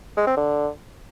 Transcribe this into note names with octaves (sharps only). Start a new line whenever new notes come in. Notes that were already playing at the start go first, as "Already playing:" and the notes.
G#3
C4
D3